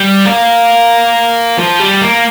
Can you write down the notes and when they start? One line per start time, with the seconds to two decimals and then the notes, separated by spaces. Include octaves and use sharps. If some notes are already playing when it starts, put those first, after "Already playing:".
Already playing: G3
0.26 A#3
1.58 F3
1.80 G3
2.02 A#3